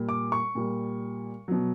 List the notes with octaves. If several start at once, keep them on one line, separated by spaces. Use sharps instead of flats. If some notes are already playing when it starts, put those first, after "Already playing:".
Already playing: A#2 G3
D6
C#6
A#2 G3
B2 F#3